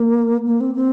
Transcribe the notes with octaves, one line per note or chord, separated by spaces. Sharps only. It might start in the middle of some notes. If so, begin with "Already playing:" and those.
Already playing: A#3
A#3
C4
C4